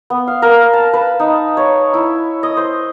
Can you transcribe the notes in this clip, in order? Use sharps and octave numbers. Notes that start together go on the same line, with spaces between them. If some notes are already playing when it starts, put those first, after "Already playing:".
B3
F5
A#4
A5
B4
D#4
C#5
E4
D#5
C5